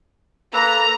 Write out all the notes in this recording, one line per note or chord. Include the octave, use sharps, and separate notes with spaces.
A#3 A4 B4 A#5